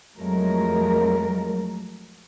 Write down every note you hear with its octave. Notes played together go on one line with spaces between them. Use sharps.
F2 F#3 G#3 A3 A#4